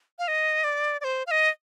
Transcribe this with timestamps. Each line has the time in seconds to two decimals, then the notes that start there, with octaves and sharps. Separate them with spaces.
0.19 F5
0.28 D#5
0.64 D5
1.01 D5
1.04 C5
1.27 F5
1.31 D#5